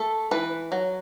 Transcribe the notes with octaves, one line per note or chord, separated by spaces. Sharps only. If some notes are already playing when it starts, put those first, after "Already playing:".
Already playing: A3 A4
E3 B4
F#3